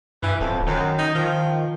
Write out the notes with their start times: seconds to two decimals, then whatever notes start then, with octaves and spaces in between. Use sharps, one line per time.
0.23 G2 E3
0.41 D1 F2
0.67 F#2 D#3
0.98 D#4
1.15 D#3 F3